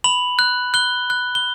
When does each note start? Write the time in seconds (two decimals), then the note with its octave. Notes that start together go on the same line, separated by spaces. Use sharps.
0.04 B5 F#7
0.39 F#6
0.74 F#6 G7
1.10 F#6
1.35 G7